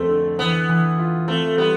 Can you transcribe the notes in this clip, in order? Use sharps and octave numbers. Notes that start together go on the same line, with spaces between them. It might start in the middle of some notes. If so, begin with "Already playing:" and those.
Already playing: F2 A3 C4
D3
E3 B3
E3
F4
A3 C4
G3 B3